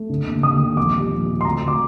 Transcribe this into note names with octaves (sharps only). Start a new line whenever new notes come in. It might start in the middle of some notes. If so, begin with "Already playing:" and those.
Already playing: A3
D3
D#2
D#2 D#6
D#2
A#1 D6
G3
A#1
G3
C6
D2 A#5
D2
D6